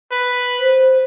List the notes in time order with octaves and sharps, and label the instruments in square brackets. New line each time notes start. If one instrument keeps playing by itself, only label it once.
[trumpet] B4
[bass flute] C5